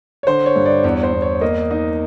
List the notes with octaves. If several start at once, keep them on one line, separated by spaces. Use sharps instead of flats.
C#5
D3 C5
C#5
G2
D5
E2 C#5
C5
E2
C#5
A#3 D#5
D#4 D#5